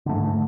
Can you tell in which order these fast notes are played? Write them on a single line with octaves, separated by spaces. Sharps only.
D3 A3 G#2